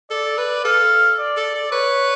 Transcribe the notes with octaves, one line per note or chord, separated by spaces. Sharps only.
A4 D5
B4
A4 F5
D5
A4
A4
B4 C#5